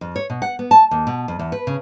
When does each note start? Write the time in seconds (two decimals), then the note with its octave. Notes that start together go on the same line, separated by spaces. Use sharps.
0.01 F2
0.16 C#5
0.30 B2
0.42 F#5
0.59 B3
0.71 A5
0.91 D#2
1.07 B2
1.28 F2
1.39 E2
1.52 B4
1.67 C#3